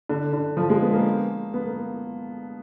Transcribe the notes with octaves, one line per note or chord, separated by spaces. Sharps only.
D3
D3
F3
G#3
B3
A#3
B3
A#3